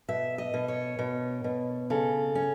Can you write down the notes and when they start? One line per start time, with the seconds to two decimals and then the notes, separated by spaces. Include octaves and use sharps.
0.08 B2 E5
0.38 D#5
0.54 B2
0.68 C#5
0.99 B2
1.44 B2
1.90 C#3 A4
2.35 C#4